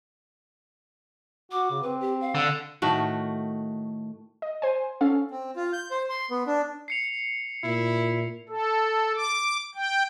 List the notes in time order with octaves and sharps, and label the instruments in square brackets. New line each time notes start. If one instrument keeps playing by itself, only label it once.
[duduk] F#4 [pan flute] D6
[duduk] C#3
[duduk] C4 [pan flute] B4
[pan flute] G4
F5
[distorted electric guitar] D3
[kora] A2 D#3 A3 F#4
[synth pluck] D#5
C5 G#5
C#4 A4 F5
[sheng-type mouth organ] C4
F4
G6
C5
C6
B3
D4
[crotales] C7 C#7 F7
[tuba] A#2 [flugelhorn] E4
[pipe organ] A4
D6
G5